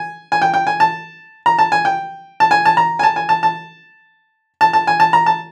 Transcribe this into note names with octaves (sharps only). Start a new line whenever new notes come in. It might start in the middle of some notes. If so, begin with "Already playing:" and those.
Already playing: G#5
G#5
G5
G5
G#5
A5
A#5
A5
G#5
G5
A5
G#5
A5
A#5
G#5
A5
G#5
A5
A5
A5
A5
G#5
A5
A#5
A5